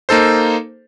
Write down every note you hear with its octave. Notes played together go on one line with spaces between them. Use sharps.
A#3 D#4 A4 C5